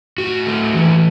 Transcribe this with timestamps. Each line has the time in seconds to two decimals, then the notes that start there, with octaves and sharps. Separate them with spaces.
0.18 A2 F#4
0.46 A3
0.74 E3